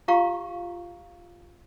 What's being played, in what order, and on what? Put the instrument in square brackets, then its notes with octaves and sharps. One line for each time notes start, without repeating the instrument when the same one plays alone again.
[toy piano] F4 G4 F5 A#5 C#6